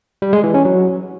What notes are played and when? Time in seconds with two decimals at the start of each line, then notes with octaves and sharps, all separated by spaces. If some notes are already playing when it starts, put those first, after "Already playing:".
0.22 G3
0.33 G#3
0.44 E3
0.54 C#4
0.65 F#3